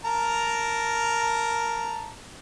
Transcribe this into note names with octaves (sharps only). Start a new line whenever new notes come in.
A#4 A5 A#5